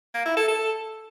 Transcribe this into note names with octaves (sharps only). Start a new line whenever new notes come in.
A#3
E4
A4
A4